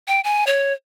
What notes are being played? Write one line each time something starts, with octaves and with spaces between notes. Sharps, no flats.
G5
G#5
C#5